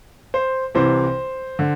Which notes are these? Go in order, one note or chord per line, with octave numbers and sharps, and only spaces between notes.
C5
C2 C3 E3 C5
D3